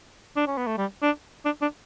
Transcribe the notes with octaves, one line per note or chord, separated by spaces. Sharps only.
D4
C#4
B3
A3
G3
D4
D4
D4